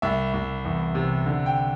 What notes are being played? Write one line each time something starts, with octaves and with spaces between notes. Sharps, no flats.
C2 E5
C2
E2
C3
D3
G5